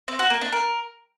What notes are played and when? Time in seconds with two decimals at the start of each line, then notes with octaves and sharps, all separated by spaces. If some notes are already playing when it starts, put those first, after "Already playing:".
0.08 C4
0.19 F#4
0.30 A#3
0.41 D4
0.52 A#4